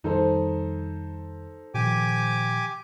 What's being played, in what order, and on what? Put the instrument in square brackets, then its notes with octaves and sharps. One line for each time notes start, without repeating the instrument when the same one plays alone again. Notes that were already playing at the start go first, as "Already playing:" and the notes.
[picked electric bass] F2 D#3 G3 [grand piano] D#4 A4 C5
[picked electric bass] A#2 D#3 F3 [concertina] G4 G#5 D6